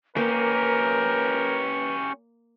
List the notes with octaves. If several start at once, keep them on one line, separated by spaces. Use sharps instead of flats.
A#3 C#4 G4 A#4 B4